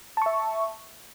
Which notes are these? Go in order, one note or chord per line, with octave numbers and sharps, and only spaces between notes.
E5 A5 C#6